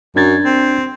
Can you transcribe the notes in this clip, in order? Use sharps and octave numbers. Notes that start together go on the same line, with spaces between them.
F#2 D4 G#6 A6
C4